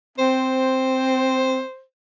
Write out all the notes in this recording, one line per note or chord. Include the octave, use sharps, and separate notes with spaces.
C4 C5